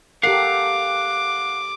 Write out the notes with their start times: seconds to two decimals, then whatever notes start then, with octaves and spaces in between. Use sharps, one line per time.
0.23 G4 A4 A#4 F5 F#5 D6